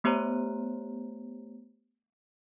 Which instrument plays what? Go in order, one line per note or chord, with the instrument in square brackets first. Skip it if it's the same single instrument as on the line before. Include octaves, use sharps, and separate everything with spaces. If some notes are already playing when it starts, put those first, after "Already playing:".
[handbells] A3 B3 G4 C5 C#5 A#5